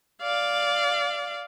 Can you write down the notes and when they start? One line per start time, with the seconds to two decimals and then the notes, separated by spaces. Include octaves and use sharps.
0.22 D5 F5